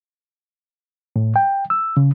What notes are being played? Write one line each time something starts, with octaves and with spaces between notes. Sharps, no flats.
A2
G5
E6
C#3